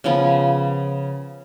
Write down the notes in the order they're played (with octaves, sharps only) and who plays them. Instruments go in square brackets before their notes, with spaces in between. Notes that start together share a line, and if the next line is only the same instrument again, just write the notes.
[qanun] C#3 F3 B3